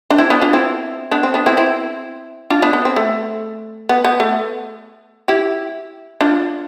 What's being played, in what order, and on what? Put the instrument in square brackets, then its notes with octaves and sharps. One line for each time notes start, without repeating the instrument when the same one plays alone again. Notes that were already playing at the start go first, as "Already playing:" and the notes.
[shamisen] D4
C4 E4
B3 D4
D4 F4
C4 E4
B3 D4
C4
B3 D4
C4 E4
C4 E4
D4 F4
B3 D4
B3
C4
A3
B3
B3
A3
E4 G4
D4 F4